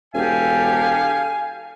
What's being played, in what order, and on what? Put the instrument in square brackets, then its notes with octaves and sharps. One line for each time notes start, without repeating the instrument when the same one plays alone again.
[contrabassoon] E1 [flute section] G4 A4 [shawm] F5 [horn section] G#5